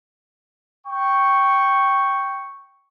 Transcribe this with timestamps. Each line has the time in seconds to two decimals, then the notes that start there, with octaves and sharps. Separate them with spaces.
0.87 G5 C#6